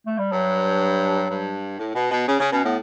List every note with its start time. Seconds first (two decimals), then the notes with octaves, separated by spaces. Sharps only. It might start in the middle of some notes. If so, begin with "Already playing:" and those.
0.07 A3
0.18 G3
0.32 G2 F#3
1.29 G2
1.78 A2
1.94 B2
2.11 B2
2.27 C#3
2.39 C#3
2.51 B2 C#4
2.63 A2 B3